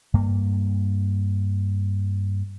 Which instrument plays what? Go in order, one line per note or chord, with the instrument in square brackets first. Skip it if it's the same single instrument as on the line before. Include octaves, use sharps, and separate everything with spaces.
[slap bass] G2 A#3